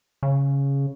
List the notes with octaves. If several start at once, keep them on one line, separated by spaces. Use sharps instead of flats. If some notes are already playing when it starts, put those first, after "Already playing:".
C#3